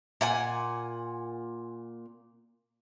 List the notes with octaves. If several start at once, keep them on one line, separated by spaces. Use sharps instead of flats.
A#2 F#5 G#5